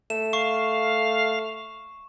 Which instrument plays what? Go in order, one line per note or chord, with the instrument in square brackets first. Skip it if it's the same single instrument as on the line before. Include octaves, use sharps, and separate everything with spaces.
[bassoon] A3 [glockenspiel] E7
[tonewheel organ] F5 [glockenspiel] C#6